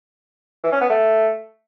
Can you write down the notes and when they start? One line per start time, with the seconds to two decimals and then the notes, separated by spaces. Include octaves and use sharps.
0.64 E3
0.72 C#4
0.81 B3
0.90 A3